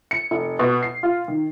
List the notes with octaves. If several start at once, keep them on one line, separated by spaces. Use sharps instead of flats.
C#7
F1
B2
C7
F4
D#3